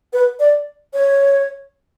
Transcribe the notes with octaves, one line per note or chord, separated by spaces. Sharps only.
B4
D5
C#5